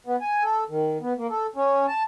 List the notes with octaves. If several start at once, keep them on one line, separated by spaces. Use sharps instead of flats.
B3
G#5
A4
D#3
B3
A#3
A4
C#4
A5